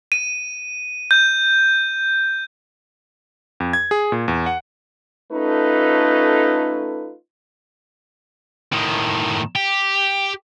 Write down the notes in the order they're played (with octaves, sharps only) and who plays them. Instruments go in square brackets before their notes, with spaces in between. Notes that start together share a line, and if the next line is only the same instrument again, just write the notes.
[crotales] D#7
G6
[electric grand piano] F2
G#6
G#4
A#2
E2
F#5
[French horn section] A3 C#4 D#4 F4 A4 B4
[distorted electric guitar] A2 D#3
G4